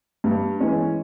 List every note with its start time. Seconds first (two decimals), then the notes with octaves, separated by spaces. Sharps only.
0.24 G2
0.60 E3 G#3 C#4